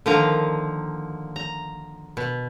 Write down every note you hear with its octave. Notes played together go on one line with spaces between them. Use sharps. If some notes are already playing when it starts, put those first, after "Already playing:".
D3 D#3 F3 A#3 A#5
A#5
B2